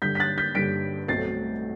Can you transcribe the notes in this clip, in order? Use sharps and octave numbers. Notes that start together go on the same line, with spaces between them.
G2 D3 G3 G6 B6
B6
F#6 A6
G6 B6
G2 D3 G3 B6 D7
B1 A2 F#3 A3 C4 A6 C7